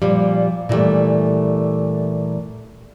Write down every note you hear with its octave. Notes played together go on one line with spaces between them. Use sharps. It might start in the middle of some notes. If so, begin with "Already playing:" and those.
A#2 F3 G3
A#2 E3 F3 G3 A3